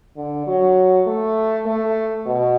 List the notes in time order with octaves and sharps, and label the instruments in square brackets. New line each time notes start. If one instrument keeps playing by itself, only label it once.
[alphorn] D3
F#3
A3
A3
B2